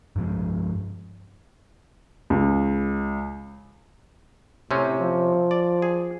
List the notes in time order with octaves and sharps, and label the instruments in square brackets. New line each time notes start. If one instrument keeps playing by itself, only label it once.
[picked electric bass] G2 F3 G#3
[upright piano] C#2
[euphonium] A2 [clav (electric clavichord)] C3 C4 C#4
[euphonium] F3
[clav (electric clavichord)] D5
G#4